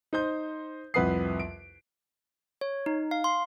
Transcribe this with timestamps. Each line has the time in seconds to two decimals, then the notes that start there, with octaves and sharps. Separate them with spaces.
0.13 D#4 C5 G6
0.94 C2 F2 B4 F#5 D#6 C7
1.40 D7
2.61 C#5
2.86 D#4
3.11 F5
3.24 C6